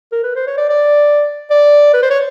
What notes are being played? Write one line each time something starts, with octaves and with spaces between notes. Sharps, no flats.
A#4
B4
C5
C#5
D5
D5
D5
B4
C5
C#5